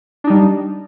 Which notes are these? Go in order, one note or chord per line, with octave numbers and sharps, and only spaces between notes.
G3 D4 D#4